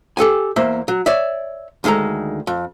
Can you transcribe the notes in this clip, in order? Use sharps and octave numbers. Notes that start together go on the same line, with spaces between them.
G4 A4 G5 G#5
E2 A#3 C5 E5
F#3
C#5 D5 E5
D2 D#3 G#3 A4 A#5
F2